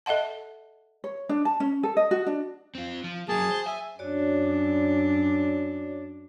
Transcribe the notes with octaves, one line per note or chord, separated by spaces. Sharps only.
A4 D#5 E5 F#5 A5
C#5
D4
A5
C#4
A4
D#5
F#4
D4
C4 F4
F3 F4
F#3 A#3 G#4 A5
C5
E5 G#5
F#2 D4 F#4 C#5 D5